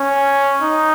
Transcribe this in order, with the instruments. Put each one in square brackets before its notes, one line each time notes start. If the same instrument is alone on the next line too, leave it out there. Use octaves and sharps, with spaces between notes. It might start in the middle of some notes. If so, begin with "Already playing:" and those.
Already playing: [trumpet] C#4
D#4